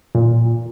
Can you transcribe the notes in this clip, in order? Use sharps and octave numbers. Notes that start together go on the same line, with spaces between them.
A#2